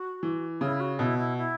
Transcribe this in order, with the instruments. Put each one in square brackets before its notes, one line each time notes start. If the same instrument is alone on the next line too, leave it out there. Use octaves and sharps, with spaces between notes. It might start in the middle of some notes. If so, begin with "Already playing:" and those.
Already playing: [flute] F#4
[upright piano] E3
[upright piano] C#3 [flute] E4
[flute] F#4
[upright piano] B2 [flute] E4
[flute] E4
E4